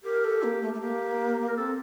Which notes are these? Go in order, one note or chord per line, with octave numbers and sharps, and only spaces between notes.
G4 A#4
A4
A#3
A3
A3
A#3 G4
A#4
C4 A4